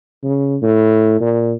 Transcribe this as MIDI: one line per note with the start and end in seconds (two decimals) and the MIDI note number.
0.23 0.57 49
0.62 1.19 45
1.21 1.53 46